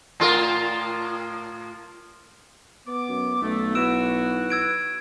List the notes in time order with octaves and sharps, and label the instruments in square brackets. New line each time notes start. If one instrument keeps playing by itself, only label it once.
[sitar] A2 F4 A#4
[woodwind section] B3 D6
[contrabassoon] F#2
[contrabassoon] B1 [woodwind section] A3
[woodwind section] B3 E4 F#4 [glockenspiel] E6 D7 E7
[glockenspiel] E6 G#6 D7